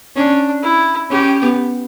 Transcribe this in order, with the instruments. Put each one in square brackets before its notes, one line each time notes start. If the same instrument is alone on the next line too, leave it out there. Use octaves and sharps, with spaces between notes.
[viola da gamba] C#4 [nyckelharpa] D4
[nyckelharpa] E4
[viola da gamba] C#4 [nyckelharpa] G4
[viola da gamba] B3